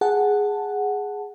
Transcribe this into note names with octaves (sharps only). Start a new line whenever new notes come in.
G#4 F#5 A5